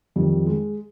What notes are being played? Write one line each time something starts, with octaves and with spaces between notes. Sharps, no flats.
F2 D#3 G3
G#3